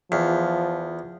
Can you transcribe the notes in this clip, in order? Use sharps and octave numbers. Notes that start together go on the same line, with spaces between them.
E2 F3